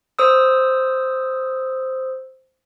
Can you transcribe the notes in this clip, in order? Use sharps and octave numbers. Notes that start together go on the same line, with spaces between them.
C5 D#6 E6